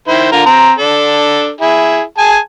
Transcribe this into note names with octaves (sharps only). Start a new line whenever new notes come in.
D#3 E4 C5
D3 F4 A#4
C4 A#5
D4 A4
E4 G#4
G#4 G#5 A5